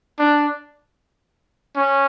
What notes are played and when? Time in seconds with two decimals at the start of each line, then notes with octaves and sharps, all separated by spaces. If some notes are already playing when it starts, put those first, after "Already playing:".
0.19 D4
1.76 C#4